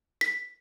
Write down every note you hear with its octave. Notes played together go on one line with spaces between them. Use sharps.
B6